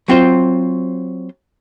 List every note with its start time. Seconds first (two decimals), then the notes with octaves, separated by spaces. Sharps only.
0.08 F#3 C4 F4 C5